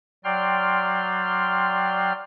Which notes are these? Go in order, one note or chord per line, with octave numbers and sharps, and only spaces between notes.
F#3 D5 G5 C6 F6